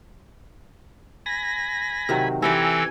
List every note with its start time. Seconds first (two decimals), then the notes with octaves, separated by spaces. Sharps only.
1.26 G#5 B5 A#6
2.09 C3 D#3 F#3
2.42 E3 C4 E4 G4 A4 D5 G#5 A#5